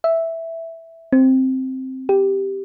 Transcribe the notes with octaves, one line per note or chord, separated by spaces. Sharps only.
E5
C4
G4